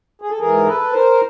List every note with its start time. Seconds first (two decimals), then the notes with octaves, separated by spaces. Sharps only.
0.22 G#4
0.30 A4
0.39 G#2 E3 G#4 A#4
0.66 A4 B4
0.93 A#4 C5